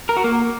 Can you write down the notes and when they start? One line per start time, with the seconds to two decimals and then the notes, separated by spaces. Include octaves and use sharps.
0.09 A#4
0.17 F#4
0.24 A#3